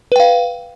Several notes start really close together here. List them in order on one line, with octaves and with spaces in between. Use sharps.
B4 G5 F5